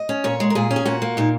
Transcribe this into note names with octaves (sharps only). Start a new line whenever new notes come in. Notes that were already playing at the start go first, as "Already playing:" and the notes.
Already playing: D#5
C#4
A#2 C#5
G#3
A#4
A#2 G#4
C#4
G#4
A#2 F#4
A#3
A#2 D#4